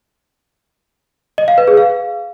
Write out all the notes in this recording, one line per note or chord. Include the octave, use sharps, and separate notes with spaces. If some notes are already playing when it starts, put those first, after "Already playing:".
D#5
F5
B4
G#4
F5